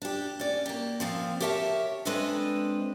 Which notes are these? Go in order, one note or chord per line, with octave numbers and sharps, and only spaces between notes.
D4 G4
C#4 D5
A#3 G4
A#2 F3 C4
G4 A#4 C#5 E5 G#5 A5
G#3 C4 D4 A4 B4 D#5